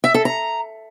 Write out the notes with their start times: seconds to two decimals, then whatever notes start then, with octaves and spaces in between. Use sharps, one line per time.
0.04 E5
0.14 A4
0.25 A#5